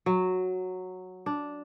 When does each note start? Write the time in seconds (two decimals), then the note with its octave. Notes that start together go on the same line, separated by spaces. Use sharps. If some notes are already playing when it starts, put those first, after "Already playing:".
0.06 F#3
1.26 D4